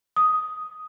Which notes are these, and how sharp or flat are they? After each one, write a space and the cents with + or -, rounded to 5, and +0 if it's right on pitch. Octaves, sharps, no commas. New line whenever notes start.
D#6 +5